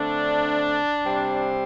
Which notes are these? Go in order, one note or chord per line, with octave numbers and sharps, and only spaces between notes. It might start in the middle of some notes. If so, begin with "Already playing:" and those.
Already playing: D3 A3 C4 D4
C3 G3 C4